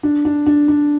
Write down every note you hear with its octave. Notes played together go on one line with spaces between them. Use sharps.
D4
D4
D4
D4